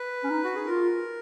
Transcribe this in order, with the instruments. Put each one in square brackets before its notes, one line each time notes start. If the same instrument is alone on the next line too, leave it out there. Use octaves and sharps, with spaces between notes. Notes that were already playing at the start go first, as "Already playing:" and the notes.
Already playing: [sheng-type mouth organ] B4
[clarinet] C#4
D#4
[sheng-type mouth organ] F#4
G#4
[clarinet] F4 [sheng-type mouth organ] A#4